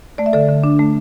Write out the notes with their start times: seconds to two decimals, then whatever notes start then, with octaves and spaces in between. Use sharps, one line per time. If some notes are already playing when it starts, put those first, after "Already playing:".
0.18 A3 D5
0.26 E5
0.33 D3 A4 D5
0.48 D3
0.64 D4
0.79 A3